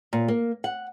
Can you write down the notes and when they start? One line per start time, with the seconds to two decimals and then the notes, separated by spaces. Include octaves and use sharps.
0.13 A#2
0.28 A#3
0.64 F#5